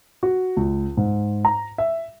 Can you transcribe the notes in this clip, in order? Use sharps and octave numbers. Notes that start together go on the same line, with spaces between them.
F#4
C#2
G#2
A#5
E5